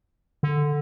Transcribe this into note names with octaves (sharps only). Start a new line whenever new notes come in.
D3